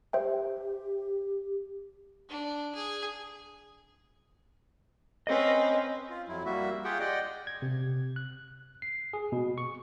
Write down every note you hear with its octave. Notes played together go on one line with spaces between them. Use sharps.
G4 C5 E5 G5
D4
G#4
C4 C#4 B4 D#5
F4
F2 F#3 E4
G3 A#3 F#4 E5
F4 G4 G#4 F#5 G5
D5 D#5 F#5 G5
G#6
C3
F#6
C7
G#4
B2
C#6